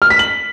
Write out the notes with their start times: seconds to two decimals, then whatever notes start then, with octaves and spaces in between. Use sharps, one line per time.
0.02 F6
0.10 B6
0.19 F#7